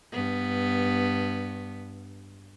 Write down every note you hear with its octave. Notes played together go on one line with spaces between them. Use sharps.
G2 B3